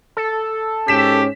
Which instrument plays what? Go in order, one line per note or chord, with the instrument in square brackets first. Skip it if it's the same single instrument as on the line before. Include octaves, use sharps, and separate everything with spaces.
[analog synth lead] A4
[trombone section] G#2 C#4 [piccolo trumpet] G4 [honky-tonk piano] B6 E7